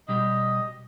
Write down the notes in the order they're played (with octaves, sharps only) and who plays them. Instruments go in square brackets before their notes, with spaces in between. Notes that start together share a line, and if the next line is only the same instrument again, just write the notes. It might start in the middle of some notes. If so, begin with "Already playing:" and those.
[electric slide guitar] B2 G3 G4 [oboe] D#5